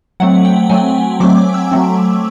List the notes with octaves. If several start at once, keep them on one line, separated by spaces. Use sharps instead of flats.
F#3 A3 C4 F#5
G5
F#3 A3 C4 G#5
F#3 A3 C4 D6
D6
E6
F#3 A3 C4